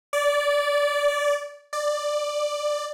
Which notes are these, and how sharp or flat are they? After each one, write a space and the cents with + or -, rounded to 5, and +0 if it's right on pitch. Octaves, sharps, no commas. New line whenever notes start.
D5 -20
D5 +10